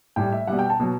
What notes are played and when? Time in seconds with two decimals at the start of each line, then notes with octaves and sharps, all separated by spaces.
0.16 A2 G3 G5
0.32 E5
0.47 B2 G3 F#5
0.59 G5
0.70 A5
0.80 B2 F#3